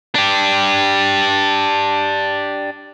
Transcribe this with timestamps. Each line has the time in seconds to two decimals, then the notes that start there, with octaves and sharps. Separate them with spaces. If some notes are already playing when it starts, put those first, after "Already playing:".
0.15 D4 G4